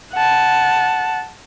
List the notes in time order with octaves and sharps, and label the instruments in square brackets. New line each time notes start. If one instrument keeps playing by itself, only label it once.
[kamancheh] F#5 A5